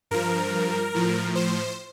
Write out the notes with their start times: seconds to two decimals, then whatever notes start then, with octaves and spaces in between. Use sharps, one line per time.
0.11 G2 F3 A#4
0.94 A2 F3
1.35 C5